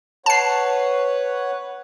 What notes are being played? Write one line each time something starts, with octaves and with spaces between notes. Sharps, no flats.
B4 C#5 F#5 A5 C7